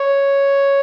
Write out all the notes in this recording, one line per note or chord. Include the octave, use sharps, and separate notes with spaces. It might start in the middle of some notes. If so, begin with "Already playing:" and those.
Already playing: C#5